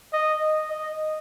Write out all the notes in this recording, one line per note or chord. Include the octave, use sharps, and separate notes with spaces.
D#5
D#5